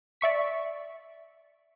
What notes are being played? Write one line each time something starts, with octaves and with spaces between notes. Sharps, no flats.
D5 E5 C#6 B6